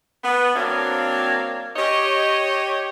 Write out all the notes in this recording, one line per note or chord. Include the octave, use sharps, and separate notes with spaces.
B3
F#3 A#3 C4 D4 C#5 F5
G4 C#5 D#5